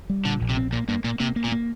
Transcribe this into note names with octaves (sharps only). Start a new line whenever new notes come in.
G3
A#2 D3
A#1
C3
C4
A#2 A#3
G2 A#3
A#2 A#3
C3 A#3
A#3
A#2
A#3